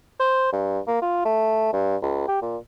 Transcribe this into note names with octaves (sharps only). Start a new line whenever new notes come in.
C5
G2
A#3
F4
A3
G2
C#2
G4
A#2